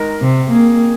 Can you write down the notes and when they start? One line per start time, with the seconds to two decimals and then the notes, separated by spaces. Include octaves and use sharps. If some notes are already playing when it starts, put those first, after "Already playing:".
Already playing: D#3 G#3 D#4 A#4
0.20 C3
0.49 D#3 A#3 C4 G#4